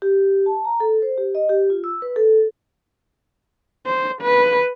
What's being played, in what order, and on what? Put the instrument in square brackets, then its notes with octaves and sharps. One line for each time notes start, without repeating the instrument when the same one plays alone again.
[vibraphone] G4
A5
A#5
A4
C5
G4
D#5
G4
F4
E6
B4
A4
[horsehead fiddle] C5
B4